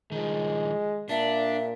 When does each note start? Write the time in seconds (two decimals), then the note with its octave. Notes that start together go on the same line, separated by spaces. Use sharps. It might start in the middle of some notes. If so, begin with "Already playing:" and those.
0.12 D#3 F3 G#3
1.09 A#2 D4 E5